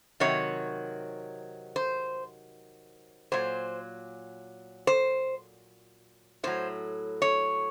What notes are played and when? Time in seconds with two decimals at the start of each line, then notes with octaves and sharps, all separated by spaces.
0.20 C3 D#3 F#3 C#5
1.76 C5
3.32 A#2 F#3 C5
4.87 C5
6.43 A2 F#3 C5
7.22 C#5